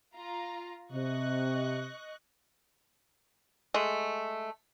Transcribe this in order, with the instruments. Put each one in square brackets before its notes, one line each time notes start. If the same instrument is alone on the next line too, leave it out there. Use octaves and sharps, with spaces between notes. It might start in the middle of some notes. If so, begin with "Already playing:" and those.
[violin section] F4 A#5
[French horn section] C3 [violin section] D#5 C#6 F#6
[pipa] G#3 A3